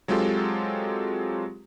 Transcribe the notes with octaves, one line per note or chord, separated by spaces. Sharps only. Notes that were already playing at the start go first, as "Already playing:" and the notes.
F#3 G#3 C4 F4 G4 A4